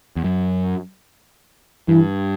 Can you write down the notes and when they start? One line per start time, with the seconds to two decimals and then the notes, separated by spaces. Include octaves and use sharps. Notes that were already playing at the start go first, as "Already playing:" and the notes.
0.17 E2
0.24 F#2
1.88 G2 E3